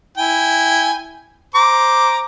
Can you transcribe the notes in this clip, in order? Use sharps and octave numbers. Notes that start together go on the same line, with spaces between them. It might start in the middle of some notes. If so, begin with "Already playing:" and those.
E4 G5 G#5
C5 A#5 D6